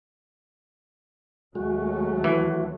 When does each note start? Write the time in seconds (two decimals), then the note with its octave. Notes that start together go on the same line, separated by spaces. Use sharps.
1.55 D#2 F#3 G#3 A3 F#4
2.24 E3 F#4